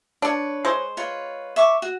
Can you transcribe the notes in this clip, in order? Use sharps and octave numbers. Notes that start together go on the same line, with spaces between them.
D4 B4 C#5
G#3 C5
F4 B4 C#5
E5 C#6 D6
F#4